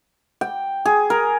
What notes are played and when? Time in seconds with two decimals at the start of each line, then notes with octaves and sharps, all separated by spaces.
0.41 G5
0.85 G#4
1.10 A#4